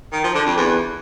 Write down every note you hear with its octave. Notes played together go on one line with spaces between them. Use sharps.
D#3
F3
D3
F2
E2